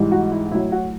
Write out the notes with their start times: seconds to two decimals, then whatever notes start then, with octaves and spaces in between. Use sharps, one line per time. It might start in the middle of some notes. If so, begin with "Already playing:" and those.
Already playing: G#2 E3 G3
0.12 F#4
0.32 E4
0.51 A2 F#3 E4
0.72 F#4